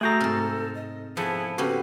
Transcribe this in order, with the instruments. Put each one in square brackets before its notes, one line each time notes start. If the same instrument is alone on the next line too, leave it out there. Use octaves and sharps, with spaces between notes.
[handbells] A3 F#4 A#6 [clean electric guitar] G#4 G5 A#5 [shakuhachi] A4
[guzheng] G#2 C3 [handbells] F6 A6
[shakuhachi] D#5
[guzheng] F3 [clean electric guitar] B3 E4 A4 [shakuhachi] G#4
[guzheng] C#3 B3 C4 [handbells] F#4 G4 A4 [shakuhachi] B4